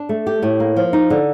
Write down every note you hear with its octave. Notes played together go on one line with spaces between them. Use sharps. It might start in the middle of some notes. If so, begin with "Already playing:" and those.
Already playing: D4
A3
G4
A2
A#3
F3
D#4
D3